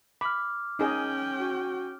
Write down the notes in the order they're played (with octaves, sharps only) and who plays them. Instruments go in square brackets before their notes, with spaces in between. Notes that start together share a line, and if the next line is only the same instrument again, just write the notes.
[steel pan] B5 [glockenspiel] D6 F6
[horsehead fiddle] C#4 G5 [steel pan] D#4 G#4 D#5
[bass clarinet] F#4